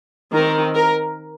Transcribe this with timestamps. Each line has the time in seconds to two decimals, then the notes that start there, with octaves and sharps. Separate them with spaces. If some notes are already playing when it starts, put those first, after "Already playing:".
0.33 D#3 C4 A#4
0.76 A#4